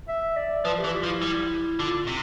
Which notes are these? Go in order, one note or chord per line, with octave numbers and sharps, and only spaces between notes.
E5
D5
F3 B4
G4
E3
F4
F3
E4
G3
D3 F4
C3